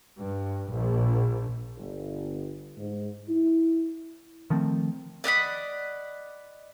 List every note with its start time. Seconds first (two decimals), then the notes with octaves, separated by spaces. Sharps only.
0.19 G2
0.71 A#1
1.77 G1
2.77 G#2
3.29 E4
4.50 D#3 F3 A3 C4
5.24 D5 D#5 F#5 B5